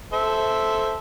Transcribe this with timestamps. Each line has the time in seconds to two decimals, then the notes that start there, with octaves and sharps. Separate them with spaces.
0.13 A4 C5 E5